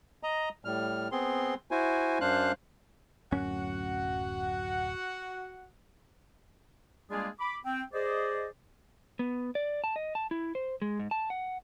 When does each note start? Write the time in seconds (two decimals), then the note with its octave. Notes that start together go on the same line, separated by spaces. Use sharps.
0.23 D#5 A#5
0.65 A2 G3 F6
1.12 B3 C4 G#4 C6
1.71 E4 F#4 C5 G#5
2.21 F#2 D4 C5 F5 F#6
3.32 D1 F#2 C#4 F#4 F#5
7.09 G3 G#3 A#3 D4 F4 G#4
7.39 B5 D6
7.64 C4 G5
7.92 G#4 C5 D5 D#5
9.19 B3
9.55 D5
9.84 A5
9.96 D#5
10.15 A5
10.31 E4
10.55 C5
10.82 G#3
10.99 G#2
11.11 A5
11.30 F#5